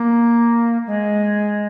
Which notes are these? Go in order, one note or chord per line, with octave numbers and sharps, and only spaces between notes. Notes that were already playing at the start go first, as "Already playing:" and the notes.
Already playing: A#3
G#3